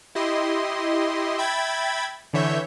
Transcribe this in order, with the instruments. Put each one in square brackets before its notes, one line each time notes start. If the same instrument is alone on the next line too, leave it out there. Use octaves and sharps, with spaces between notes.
[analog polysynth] E4 G4 D#5 C6
E5 G5 B5 G#6 A6
D3 E3 C#5 E5 G6